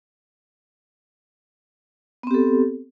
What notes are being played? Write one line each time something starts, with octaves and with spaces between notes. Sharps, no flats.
B3 C4 G4 A4